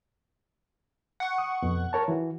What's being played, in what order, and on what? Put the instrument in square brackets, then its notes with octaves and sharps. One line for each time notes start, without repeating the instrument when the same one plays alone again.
[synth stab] F#5 C#6
[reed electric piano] D#6
F2 B2
A#4 C#5 A5
E3 F#4